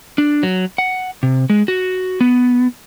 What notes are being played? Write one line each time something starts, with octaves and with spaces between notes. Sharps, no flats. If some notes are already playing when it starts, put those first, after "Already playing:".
D4
F#3
F#5
C3
G#3
F#4
B3